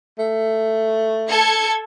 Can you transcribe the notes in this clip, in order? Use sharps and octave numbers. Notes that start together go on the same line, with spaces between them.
A3
A4 G#6 C#7